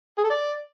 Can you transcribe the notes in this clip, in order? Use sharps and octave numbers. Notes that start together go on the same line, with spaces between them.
G#4
A4
D5